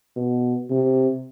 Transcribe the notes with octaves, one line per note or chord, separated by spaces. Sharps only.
B2
C3